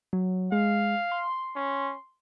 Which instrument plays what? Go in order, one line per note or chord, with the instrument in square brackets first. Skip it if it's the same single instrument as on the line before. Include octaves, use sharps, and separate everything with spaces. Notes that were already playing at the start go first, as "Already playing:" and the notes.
[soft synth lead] F#3
[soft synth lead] G#3 [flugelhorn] F5
[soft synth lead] C6
[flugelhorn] C#4